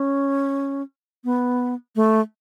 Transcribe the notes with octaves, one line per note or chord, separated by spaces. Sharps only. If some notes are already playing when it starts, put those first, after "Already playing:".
Already playing: C#4
B3
A3